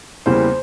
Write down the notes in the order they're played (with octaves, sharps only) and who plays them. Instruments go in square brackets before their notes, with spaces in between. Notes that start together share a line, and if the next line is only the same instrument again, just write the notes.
[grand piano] E2 C#3 E3 G3 A#3 C5